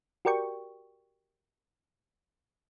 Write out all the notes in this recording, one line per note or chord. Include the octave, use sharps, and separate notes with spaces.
F#4 G4 A#4 D5 G5 C#6